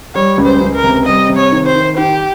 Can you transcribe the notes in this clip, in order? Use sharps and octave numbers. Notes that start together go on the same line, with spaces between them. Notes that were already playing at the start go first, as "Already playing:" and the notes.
G3 C#5
C#2
C5
C#2
A#4
C3
G3 D#5
C3
C#5
D#3
C5
D#3
D#3 G4